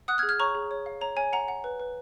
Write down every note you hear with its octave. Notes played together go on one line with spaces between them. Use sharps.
F#5 D#6 F#6
F6 G#6
G#4
F6 G#6
C#5 A#5 C#6
G#4
C#5
F5
C#5 A#5
C#5 G#5
F#5 A#5
F#5
B4
B4